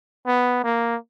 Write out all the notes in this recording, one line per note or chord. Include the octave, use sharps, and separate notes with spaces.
B3
A#3